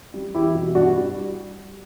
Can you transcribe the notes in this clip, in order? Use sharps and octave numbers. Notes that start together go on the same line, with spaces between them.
G3
E2 E4 G4
B2
G2 D4 F#4
G3